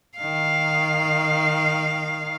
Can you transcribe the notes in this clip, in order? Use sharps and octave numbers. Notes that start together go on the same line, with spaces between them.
D#3 F5